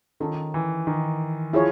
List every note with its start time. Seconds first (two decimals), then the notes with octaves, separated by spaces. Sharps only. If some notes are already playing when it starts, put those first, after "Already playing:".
0.20 D#3 C#4 F4 A4
0.54 E3
0.87 D#3
1.53 F3 E4 G#4 C#5